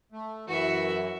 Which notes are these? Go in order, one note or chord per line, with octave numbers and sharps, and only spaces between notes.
A3
F#2 E3 F#4 E5